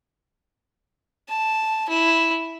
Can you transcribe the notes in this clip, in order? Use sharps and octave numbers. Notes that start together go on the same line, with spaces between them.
A5
E4